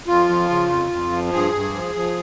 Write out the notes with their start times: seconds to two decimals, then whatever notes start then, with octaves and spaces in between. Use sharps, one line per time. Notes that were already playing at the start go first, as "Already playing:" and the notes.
0.07 F2 F4
0.29 F3
0.49 C#3
0.70 F2
0.91 F2
1.12 F3
1.32 G2 G#4
1.53 G2
1.74 F3
1.95 F3